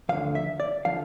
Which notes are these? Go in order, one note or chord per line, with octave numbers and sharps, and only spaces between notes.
D2 D3 F3 F5
E5
D5
D3 F3 F5